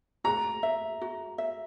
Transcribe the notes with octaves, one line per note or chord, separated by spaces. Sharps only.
F#4 A#5
E5
F#4
E5